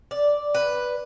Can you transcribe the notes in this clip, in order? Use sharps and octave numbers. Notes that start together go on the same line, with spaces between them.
D5
B4